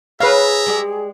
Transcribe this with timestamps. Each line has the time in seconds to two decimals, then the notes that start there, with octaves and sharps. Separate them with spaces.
0.20 G#4 B4 C#5 E5 F5 A#5
0.66 G#3 G4 D5